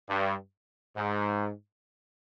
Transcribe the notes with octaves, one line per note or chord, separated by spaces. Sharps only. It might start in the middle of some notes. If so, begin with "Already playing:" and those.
G2
G#2